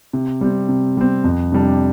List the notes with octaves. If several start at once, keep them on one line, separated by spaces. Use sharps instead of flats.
C3
G3 C4
C3
G3 C4
F2
C3 G3 D4